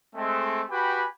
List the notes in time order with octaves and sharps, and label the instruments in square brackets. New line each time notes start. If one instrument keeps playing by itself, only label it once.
[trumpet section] G#3 A3 C4
F#4 G4 B4 G5 G#5 B5